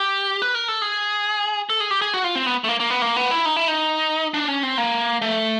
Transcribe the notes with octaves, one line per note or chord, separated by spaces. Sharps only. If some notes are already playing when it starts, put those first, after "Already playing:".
Already playing: G4
B4
A#4
A4
G#4
A4
G#4
G4
G#4
F#4
F4
C4
B3
A3
A#3
A#3
B3
A#3
B3
E4
D#4
E4
D#4
D4
C#4
C4
A#3
A3